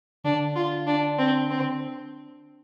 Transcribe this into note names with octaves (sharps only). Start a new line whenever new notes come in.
D3 D4
F4
D4
C4
C4